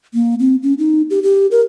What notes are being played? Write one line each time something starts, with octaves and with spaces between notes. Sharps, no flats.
A#3
C4
C#4
D#4
G4
G4
A#4